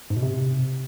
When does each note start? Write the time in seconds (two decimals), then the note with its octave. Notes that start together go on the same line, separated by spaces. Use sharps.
0.10 G#2
0.16 B2
0.22 C3